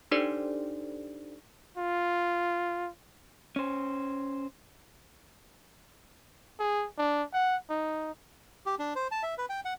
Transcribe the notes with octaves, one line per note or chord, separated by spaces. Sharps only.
D4 D#4 G4 A4 C5 D5
F4
C#4 C5
G#4
D4
F#5
D#4
G4
D4
C5
A5
E5
B4
G5
F#5